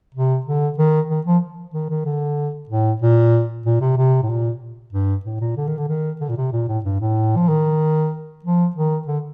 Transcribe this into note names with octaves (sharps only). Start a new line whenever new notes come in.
C3
D3
D#3
D#3
F3
D#3
D#3
D3
A2
A#2
A#2
C3
C3
A2
A#2
G2
A2
A#2
D3
D#3
D3
D#3
D3
A#2
C3
A#2
A2
G2
A2
F3
D#3
F3
D#3
D3